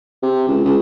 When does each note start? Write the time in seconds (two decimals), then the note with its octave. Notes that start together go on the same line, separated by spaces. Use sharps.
0.22 C3
0.48 C#2
0.64 C#2